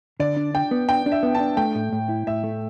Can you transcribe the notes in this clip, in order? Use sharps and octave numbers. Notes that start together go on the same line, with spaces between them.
D3 D5
D4
D4 G5
B3
D4 G5
D4
E5
B3
A5
D4
A3 G5
A2
A2
E4
A2 E5
A3